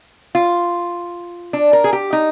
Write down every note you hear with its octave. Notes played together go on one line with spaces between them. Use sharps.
F4
D4
A#4
G#4
G4
D#4